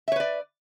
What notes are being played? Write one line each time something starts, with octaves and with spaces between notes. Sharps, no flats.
B4 C#5 D5 E5